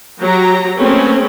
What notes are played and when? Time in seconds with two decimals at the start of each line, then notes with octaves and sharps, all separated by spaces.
0.21 F#3 G4 A#5
0.79 A3 A#3 C4 C#4 G#4 B4